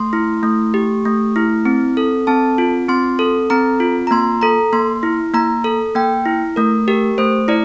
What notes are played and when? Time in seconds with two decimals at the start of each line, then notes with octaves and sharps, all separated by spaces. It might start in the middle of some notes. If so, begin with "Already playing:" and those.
Already playing: A3 C6
0.13 E4
0.43 A3
0.74 G4
1.05 A3
1.36 E4
1.65 C4
1.97 A4
2.27 C4 A5
2.58 F4
2.89 C4 C6
3.19 A4
3.50 C4 A#5
3.80 F4
4.07 A#5
4.11 A#3 C6
4.41 A4 A#5
4.72 A#3 C6
5.03 E4
5.34 A#3 A#5
5.64 A4
5.95 A#3 G5
6.25 E4
6.56 A3 A#4
6.88 G4 A#4
7.18 A3 C5
7.48 E4 D5